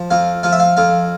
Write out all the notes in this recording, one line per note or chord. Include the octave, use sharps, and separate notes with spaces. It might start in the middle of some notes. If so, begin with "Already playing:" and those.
Already playing: F3
F2 F5
F3 F5
E5
F5
F2 F5